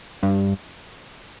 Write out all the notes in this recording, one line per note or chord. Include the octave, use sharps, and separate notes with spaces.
G2